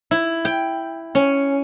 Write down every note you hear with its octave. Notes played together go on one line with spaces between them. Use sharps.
E4
G5
C#4